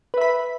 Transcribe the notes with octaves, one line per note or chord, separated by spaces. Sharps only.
B4 E5 B5